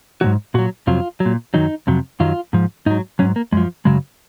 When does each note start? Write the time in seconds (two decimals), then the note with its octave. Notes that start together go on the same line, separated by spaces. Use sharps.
0.21 G#2 D#3 F#3 F#4
0.54 A#2 F#3 F#4
0.87 F2 C3 F#3 F4
1.20 F#3
1.25 A#2
1.54 F#2 D#3 F#3 D#4
1.87 F2 C3 F#3
2.20 F#2 D#3 F#3 F4
2.53 G#2 F3
2.86 G#2 F#3 D#4
3.19 G#2 F#3 C#4
3.36 A#3
3.52 F#2 F3 G#3
3.85 F#2 C#3 F#3 G#3